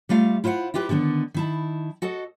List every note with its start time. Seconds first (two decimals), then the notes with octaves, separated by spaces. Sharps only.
0.09 G3 A3 F4 F5
0.44 E4 F4 C5 E5 F#5
0.74 E4 F4 G4 B4
0.89 D3 D#3 B3 D4
1.34 D#3 E4 A5
2.02 F#4 A4 D#5